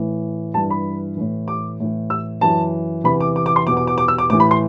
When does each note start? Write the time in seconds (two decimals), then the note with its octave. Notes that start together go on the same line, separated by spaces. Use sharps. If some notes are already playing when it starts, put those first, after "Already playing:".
Already playing: A2 E3
0.54 G2 E3 A5
0.70 B5
1.17 A2 E3
1.48 D6
1.80 A2 E3
2.10 E6
2.41 F#2 E3 A5
3.04 E2 C3 E3 B5
3.21 D6
3.36 D6
3.46 D6
3.56 C6
3.67 E2 B2 D6
3.77 D6
3.87 D6
3.98 D6
4.08 E6
4.18 D6
4.30 A2 E3 D6
4.40 B5
4.51 C6